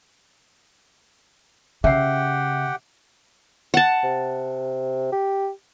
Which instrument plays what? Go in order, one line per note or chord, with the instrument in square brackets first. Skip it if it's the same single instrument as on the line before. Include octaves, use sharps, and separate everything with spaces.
[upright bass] C#3 [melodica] G4 F#5 G5 [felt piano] E5 C7
[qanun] F#5 A5
[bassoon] C3
G4